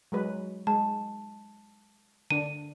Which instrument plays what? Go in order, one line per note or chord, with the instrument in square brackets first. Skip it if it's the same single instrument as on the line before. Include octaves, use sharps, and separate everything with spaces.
[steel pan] F#3 G#3 B4
[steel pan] G#3 [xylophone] A5
[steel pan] D3 D4 [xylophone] D#7